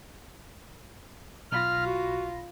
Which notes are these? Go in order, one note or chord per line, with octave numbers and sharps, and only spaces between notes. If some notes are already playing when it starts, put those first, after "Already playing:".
B1 F4 B5 F6 A#6
F#4